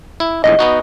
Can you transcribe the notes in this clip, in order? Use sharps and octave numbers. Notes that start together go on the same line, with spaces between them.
E4
A#1 E2 A2 D#5
B3 D#4 F#4